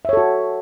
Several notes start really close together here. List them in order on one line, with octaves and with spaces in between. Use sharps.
E5 C#5 A4 F#4